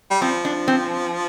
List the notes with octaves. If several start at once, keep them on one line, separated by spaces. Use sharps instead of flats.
G3
F3 C4
D4
C4